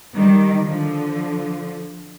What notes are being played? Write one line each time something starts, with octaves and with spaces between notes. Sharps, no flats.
D#3 G3
D3 F3